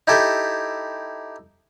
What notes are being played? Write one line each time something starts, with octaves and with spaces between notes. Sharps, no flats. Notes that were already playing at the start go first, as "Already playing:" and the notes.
D#4 E4 G4 A4